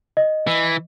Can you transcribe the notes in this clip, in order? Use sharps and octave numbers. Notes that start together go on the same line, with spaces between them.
D#5
E3